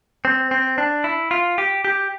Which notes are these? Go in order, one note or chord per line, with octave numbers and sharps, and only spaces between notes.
C4
C4
D4
E4
F4
G4
G4